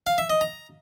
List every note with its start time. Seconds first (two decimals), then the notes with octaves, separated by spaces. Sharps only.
0.07 F5
0.18 E5
0.30 D#5
0.41 A#5